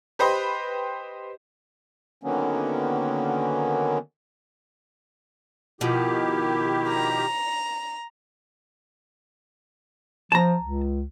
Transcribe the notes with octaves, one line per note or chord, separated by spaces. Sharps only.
G4 B4 C5 D#5
D3 D#3 F#3 A#3 B3 C#4
B2 D#3 F3 E4 G4
A#5
F3 A5 A#5
C#2